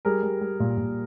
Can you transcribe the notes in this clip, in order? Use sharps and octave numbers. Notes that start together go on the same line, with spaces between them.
G3 G#4 A#4
G3
G3
A#2
A#2